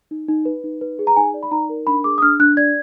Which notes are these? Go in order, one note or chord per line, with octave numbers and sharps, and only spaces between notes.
D#4
D#4
B4
D#4
B4
G#4
A#5
D#4 G#5
D5
B5
D#4 A#5
A#4
D4 B5
G#4 D6
D#6
D4 F6
D4 F#6
D5 G#6